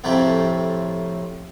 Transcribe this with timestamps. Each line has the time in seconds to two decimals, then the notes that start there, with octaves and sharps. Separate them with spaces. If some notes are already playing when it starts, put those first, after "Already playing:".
0.04 F2 A2 C3 F3 A3 C4